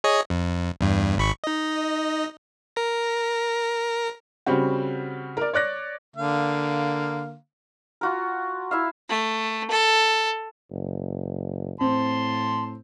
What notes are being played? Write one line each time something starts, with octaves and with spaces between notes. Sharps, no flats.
G#4 C#5 D#5
F2
E2 G2
G#1 B5 C#6
D#4 D#5
A#4 A#6
C#3 G3 C4 F#4
A#4 D5
C#5 D5 F#6 A#6
D3 A#3 F5
F4 F#4 A#4
E4 E5 F5
A3
A4
F#1
A2 C4 A5 C6